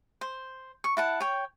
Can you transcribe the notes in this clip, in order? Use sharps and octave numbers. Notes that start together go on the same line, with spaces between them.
C5
C#6
E4 F#5 A5
C#5 G5